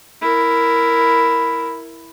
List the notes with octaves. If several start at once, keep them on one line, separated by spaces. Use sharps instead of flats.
E4 A#4